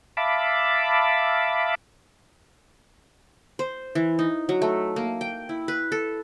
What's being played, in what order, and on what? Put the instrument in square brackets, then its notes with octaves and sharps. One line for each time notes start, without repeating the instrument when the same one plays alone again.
[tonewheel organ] E5 F5 A5 B5 D6
[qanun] C5
E3
D#4
F#3
A3
A#3
G5
E4
B4
A4